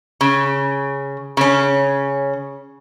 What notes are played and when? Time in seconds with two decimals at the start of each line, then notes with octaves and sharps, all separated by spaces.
0.21 C#3
1.37 C#3 C#4